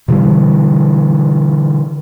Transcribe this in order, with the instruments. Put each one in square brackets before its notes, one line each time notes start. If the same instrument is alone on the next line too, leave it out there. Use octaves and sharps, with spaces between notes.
[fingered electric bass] B2 D3 E3 G3